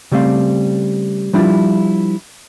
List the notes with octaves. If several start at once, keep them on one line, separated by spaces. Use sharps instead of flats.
C#3 G3 A3 C4 F5
F3 G3 D4 E4 F4